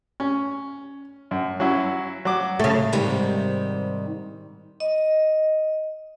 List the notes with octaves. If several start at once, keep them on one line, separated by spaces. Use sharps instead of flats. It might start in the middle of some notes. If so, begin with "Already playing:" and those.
C#4
F#2
F#3 C#4 E4
F#3 D6
C#3 A3
G#2 C3 D#3 G3
D#5